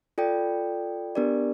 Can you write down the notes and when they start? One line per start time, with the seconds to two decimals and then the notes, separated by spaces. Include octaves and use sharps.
0.18 F4 A4 D5 G5
1.15 B3 D4 G4 A#4 D5